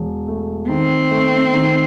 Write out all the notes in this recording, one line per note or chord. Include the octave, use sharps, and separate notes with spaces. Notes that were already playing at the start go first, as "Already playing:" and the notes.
Already playing: E1
A3
D#3 C4
A3
D#3